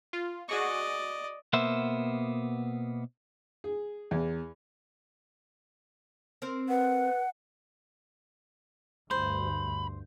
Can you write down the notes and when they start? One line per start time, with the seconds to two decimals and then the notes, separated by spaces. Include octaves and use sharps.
0.13 F4
0.49 F#4 G#4 D5 D#5 C#6
1.53 B2 A#3 B3 C5 E5
3.64 G#4
4.11 E2
6.42 C4 A#4 C5
6.69 B4 F#5
9.11 D2 G2 C5 B5